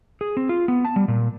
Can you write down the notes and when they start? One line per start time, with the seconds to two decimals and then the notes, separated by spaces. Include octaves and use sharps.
0.21 G#4
0.37 C4
0.49 F4
0.68 B3
0.85 A5
0.96 G3
1.08 A#2